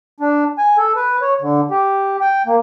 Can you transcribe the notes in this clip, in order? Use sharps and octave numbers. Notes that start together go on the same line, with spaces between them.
D4
G#5
A4
B4
C#5
D3
G4
G5
A#3